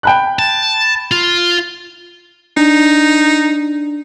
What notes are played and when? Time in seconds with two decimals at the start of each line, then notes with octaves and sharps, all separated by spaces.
0.03 G5 B5 F#6
0.39 A5
1.11 F4
2.57 D4 D#4